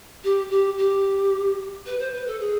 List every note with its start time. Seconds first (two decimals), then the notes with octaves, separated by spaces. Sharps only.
0.24 G4
0.51 G4
0.78 G4
1.86 B4
2.00 C5
2.14 B4
2.27 A4
2.40 G#4